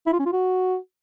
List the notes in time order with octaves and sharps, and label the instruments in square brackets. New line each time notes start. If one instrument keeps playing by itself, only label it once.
[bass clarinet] E4
F4
C#4
F4
F#4